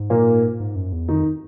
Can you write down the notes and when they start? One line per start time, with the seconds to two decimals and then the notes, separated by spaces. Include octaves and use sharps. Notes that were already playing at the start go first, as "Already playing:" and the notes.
Already playing: G#2
0.10 A#2 A#3
0.60 G#2
0.76 F#2
0.93 E2
1.08 F2 D#3 D#4